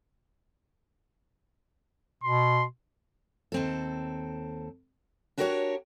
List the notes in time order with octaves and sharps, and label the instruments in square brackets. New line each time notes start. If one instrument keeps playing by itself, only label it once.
[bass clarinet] B2 [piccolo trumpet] C6
[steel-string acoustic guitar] D#2 C4 A4
D4 F#4 G4 A#4 C5 C#5